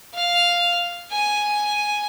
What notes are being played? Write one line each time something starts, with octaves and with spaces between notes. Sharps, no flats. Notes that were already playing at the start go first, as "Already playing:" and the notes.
F5
G#5